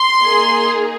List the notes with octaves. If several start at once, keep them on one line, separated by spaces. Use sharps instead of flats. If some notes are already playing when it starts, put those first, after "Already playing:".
Already playing: C6
A#3 D#4 G#4